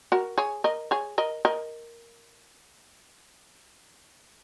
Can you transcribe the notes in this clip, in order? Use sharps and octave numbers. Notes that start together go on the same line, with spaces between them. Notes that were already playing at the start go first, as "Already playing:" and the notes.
F#4 A#4
G#4 C#5
A#4 D#5
G#4 C#5
A#4 D#5
A#4 D#5